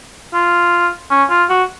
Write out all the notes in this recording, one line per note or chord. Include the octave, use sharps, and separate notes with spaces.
F4
C#4
F4
F#4